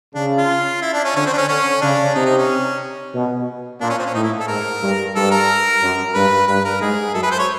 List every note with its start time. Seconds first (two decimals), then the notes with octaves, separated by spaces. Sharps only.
0.15 C#3 D4
0.38 F4
0.82 E4
0.93 D4
1.04 C#4
1.15 D3 C#4
1.26 C4
1.33 D4
1.38 C#4
1.48 D3 C#4
1.82 C#3 D4
2.15 C3 D#4
2.26 D#4
2.38 C#4
3.15 B2
3.81 A#2 D4
3.90 C#4
3.99 C4
4.07 C#4
4.14 A2 D#4
4.23 E4
4.40 A4
4.48 G#2 A#4
4.82 G2
5.15 G2 A4
5.31 A#4
5.82 F#2
6.14 G2 B4
6.48 G2 B4
6.65 A#4
6.81 G#2 G#4
7.14 F#2 A4
7.23 B4
7.31 C5
7.39 C#5